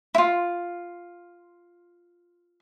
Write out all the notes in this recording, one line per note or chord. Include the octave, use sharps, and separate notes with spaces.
E4 F4